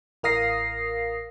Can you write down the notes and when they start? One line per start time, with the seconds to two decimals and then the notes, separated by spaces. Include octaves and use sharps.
0.23 A1 A#4 F5 D#6 A#6 C7